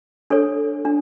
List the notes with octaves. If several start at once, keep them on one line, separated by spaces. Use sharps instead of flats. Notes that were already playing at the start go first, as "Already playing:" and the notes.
D4 A4 C#5
D4